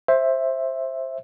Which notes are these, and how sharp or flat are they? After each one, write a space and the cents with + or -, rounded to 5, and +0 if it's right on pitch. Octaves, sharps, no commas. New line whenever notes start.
C5 +15 E5 +0